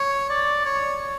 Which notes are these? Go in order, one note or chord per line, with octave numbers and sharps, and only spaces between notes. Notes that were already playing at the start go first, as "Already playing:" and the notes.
Already playing: C#5
D5
C#5